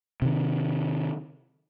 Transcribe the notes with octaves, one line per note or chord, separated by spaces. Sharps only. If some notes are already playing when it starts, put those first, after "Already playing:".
C3 D#3